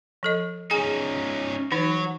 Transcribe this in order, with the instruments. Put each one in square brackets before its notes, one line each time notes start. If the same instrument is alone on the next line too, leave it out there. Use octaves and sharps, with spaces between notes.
[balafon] F3 A4 D#5
[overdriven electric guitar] C#4 D#4 [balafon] G#4 G#5
[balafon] E3 D#4 [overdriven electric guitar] F#4 C#5